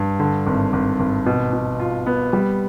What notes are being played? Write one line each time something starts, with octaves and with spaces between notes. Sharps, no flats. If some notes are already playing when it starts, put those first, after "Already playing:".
Already playing: G2
D3
G#1
G#1
G#1
B2
B2
F4
B3
G3